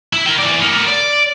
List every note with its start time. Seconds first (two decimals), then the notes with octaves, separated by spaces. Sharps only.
0.13 E4
0.26 A#4 G5
0.39 E3 D5
0.62 B3 A#4
0.88 D5